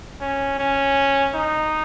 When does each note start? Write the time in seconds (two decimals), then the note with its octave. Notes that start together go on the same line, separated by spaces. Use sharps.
0.21 C#4
0.59 C#4
1.35 D#4